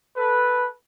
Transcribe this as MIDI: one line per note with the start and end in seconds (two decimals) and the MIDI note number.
0.16 0.68 69
0.16 0.68 71